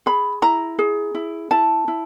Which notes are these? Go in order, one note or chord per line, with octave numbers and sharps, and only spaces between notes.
G#4 B5
E4 A#5
G#4
E4
E4 A5
E4